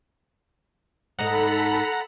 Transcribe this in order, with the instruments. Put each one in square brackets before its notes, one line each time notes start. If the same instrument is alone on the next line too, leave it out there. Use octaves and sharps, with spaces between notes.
[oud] G#2 D#4 [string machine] A4 B5 [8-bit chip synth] F#5 A#5